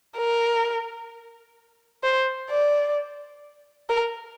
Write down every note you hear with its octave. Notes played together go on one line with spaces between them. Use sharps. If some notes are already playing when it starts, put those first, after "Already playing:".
A#4
C5
D5
A#4